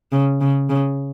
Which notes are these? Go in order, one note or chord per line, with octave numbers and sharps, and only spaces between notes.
C#3
C#3
C#3